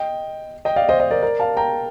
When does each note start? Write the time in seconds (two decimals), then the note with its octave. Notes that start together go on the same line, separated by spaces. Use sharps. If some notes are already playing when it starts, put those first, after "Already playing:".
Already playing: D#5 G5
0.65 D#5 G5
0.76 D5 F5
0.89 C5 D#5
1.00 C5 D#5
1.11 A#4 D5
1.23 A#4 D5
1.40 F5 A5
1.57 G5 A#5